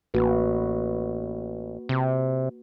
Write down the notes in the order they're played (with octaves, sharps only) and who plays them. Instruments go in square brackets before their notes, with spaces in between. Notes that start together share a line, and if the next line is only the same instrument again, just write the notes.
[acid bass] A1 [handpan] A#3 F#4 B4
[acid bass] C3